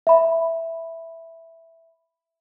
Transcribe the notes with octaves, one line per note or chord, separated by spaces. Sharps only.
E5 B5